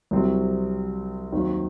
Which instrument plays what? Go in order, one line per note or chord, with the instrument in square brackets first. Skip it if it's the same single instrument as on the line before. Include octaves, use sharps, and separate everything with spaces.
[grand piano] C2 C3 F#3 C4
D#2 D#3 F#3 C4 D#4